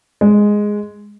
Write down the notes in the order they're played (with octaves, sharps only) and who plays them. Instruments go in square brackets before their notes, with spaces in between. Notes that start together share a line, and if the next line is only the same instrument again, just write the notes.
[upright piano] G#3